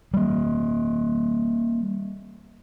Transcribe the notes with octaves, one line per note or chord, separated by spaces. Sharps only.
G3 A#3